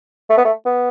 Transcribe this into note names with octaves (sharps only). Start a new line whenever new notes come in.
A3
B3
A3
B3